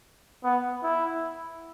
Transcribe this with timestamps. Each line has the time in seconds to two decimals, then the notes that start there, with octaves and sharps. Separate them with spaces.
0.43 B3
0.83 E4